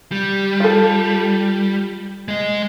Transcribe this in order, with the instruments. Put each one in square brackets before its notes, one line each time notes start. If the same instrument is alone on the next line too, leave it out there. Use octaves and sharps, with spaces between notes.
[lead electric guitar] G3
[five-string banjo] F4 A4
[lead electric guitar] G#3 D#5